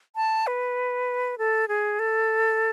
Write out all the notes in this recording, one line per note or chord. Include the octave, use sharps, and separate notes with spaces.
A5
B4
A4
G#4
A4